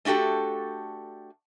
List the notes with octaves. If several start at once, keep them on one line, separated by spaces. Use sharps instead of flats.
A3 D4 F#4 G4 A4